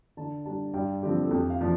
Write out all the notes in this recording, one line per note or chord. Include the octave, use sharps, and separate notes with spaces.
D3 A5
G3 D4 A5
G2 G5
D3 F3 C4 G4
A4
F2 G4
F5
C3 F3 D4